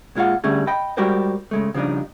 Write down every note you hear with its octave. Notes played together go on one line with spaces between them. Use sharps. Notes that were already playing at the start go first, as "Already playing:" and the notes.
A#2 G#3 F4 F5 F#5
D3 G3 A3 C#4 G#4
D#5 G5 B5
G3 G#3 F#4 G4 A#4 C5
C#3 G#3 A3
C#3 F3 G3 D4 D#4